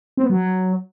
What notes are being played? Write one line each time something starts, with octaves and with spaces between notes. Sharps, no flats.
C4
B3
F#3